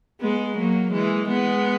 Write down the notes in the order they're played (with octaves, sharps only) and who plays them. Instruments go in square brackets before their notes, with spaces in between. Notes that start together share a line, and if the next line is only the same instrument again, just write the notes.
[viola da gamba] G#3 B3
F#3 A#3
E3 G#3
G#3 B3